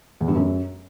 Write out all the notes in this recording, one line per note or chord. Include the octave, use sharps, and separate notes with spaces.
E2
G2
F#2